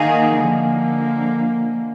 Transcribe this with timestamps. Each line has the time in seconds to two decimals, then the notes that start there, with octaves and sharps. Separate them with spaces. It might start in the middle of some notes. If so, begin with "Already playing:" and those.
Already playing: D#3 A#3 D#4 G#4 D#5 F5 F#5 G#5
0.39 D3 F3 A#3